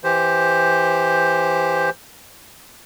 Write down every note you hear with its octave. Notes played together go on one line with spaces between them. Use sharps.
E3 G4 C5